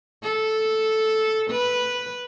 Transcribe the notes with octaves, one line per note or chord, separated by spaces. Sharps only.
A4
B4